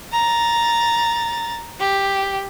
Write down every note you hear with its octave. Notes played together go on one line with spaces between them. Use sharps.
A#5 A6
G4